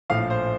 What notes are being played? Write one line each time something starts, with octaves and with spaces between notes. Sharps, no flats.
A#1 A2 F3 F5
C5